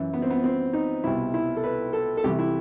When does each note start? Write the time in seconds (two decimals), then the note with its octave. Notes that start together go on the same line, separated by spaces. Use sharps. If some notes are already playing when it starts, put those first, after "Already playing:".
Already playing: F#2 E3
0.14 B3
0.22 C4
0.30 B3
0.44 C4
0.73 D#4
1.04 C2 B2 E4
1.34 E4
1.57 A4
1.64 B4
1.93 A4
2.17 A4
2.24 C2 C3 E3 G4
2.39 E4